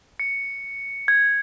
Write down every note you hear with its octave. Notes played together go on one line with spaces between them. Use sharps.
C#7
G#6